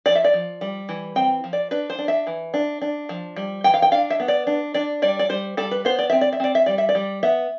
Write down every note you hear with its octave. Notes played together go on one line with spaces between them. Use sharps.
F3 D5
E5
D5
F3
G3
E3
C4 G5
F3
D5
D4 B4
C5
D4
E5
E3
D4
D4
F3
G3
E3 G5
F5
G5
D4 F5
E5
B3
D5
D4
D4 D5
G3 D5
D5
G3 C5
G3 A4
B4
B3 C5
D5
C4 E5
D5
E5
C4 D5
E5
G3 D5
E5
D5
G3
B3 E5